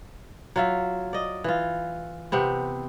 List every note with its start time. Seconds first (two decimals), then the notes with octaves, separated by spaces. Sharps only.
0.56 F#3 F4 E5
1.13 D5 D#5
1.44 E3 F4
2.32 C3 B3 C4